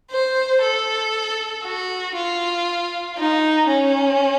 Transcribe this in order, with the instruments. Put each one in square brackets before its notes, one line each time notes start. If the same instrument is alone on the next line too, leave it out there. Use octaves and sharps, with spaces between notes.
[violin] C5
A4
F#4
F4
D#4
C#4